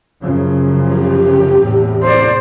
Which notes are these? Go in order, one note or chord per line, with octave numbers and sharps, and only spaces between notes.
F#2 C#3 F3
G4
E2 A2 C3
C5 D5